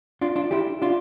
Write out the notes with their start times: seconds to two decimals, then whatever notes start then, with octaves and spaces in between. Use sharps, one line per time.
0.21 D4 F4
0.36 D4 F4
0.51 E4 G4
0.82 D4 F4